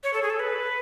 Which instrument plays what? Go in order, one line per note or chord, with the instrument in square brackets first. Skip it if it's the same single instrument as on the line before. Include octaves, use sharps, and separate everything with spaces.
[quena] C#5
A4
G#4
A4
B4